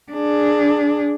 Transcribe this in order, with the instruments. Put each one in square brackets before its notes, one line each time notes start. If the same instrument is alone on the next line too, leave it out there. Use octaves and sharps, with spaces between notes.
[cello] D4 G#4